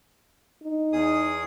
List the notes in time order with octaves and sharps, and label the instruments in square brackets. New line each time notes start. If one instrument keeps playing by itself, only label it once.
[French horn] D#4
[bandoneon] E2 G#4 D#6